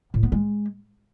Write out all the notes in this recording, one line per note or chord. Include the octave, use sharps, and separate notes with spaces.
A2
B3
G#3